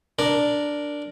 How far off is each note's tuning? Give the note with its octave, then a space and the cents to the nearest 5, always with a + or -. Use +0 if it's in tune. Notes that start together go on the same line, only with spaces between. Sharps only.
D4 +0 A#4 +0